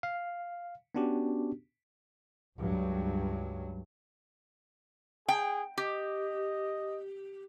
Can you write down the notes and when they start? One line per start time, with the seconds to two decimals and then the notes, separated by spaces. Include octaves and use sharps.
0.03 F5
0.95 B3 C#4 D4 F#4 G4
2.59 C#2 G2 F#3
5.29 G#4 G5
5.78 G4 D#5